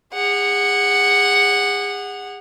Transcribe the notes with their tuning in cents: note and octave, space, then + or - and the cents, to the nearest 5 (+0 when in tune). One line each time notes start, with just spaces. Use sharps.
G#4 -35 F#5 +0